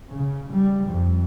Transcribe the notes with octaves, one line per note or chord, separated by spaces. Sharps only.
C#3
G3
F2